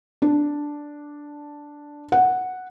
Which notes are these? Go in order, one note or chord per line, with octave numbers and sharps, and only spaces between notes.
D4
F#5